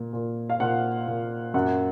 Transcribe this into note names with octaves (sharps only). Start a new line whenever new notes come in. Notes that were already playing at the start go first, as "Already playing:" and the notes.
Already playing: A#2
A#2
F5
A#2 F#5
A#2
F#2 F#5